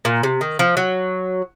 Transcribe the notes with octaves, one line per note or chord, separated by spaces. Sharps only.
A#2
C3
D#3
F3
F#3